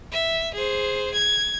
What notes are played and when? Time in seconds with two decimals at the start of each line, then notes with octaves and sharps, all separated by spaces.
0.12 E5
0.54 G#4 C5
1.14 G#6